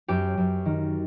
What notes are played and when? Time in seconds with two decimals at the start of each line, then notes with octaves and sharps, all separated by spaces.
0.08 F#2 G4
0.37 F#2
0.66 D#3